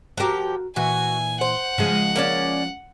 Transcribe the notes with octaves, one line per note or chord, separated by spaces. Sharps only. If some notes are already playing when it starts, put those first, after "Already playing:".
F3 F#4 G4 A#4
A#2 E3 F#4 G#5
C5 F#5
C#3 F3 G#3
A#3 C#4 D5